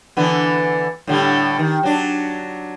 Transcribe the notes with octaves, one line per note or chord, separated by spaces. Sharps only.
D3 E3 B3
A2 D3 G3
D#3
F#3 D4